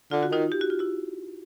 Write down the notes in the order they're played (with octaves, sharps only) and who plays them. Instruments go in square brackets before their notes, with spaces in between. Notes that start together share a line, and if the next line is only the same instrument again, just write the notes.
[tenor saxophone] D3 [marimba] F4
[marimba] F#4
[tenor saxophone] D#3 [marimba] D#4 F4
[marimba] G4
F#4
F4
E4 F#4